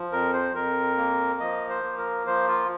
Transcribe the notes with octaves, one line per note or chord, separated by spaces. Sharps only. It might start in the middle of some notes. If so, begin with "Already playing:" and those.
Already playing: F3
F2 A#4
C5
F2 A#4
A#3
F3 D#5
C5
A#3
A#4
F3 C5
F4